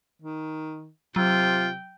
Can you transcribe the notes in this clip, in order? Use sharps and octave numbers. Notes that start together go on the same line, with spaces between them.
D#3
C3 F#3 F4 G5